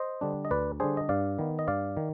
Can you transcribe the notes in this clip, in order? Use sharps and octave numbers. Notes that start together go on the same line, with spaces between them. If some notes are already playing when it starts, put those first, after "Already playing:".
Already playing: C5 D#5
D3 G3 D4
D#5
D2 B4 D5
D3 G3 D4 G#4 C5
D#5
G2 D5 F5
D#3 B3
D#5
G2 D5 F5
D#3